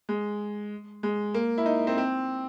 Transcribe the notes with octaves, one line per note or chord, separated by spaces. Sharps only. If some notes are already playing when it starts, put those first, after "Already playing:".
G#3
G#3
A#3
E4
D#4
C4
C4